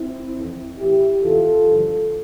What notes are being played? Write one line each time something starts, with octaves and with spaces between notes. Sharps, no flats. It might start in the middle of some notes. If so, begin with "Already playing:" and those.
Already playing: C4 E4
F2 E3
A2 E3 E4 G4
E2 C3 E3 F4 A4
G2 D3 F3